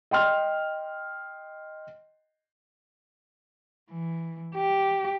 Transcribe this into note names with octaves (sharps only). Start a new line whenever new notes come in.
D#5 G5 C6 F6
E3
G4